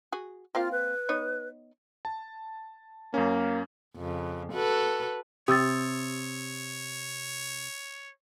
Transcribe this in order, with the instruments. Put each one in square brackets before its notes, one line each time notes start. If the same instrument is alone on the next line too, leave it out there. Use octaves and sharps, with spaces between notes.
[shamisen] F#4 G#4
[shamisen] A#3 C4 F5 [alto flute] F4
[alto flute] B4
[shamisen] B3 D#4 C#5
[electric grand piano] A5
[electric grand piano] F#2 C#4 [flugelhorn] A#3
[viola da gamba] F2 C#3
F#4 A4 B4
[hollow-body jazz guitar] C3 [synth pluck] G4 [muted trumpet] C#5 [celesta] D#6 E6 A6